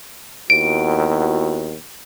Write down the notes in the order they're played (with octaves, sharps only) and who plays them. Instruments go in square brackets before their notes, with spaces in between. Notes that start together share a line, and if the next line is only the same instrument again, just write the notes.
[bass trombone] D#2 [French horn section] B3 E4 F#4 [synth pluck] D7